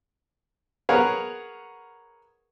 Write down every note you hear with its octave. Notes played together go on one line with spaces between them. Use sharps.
G#4 A#4 B4 C#5 F5 F#5